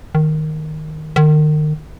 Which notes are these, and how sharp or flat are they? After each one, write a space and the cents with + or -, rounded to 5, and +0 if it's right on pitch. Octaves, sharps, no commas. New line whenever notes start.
D#3 -5
D#3 -35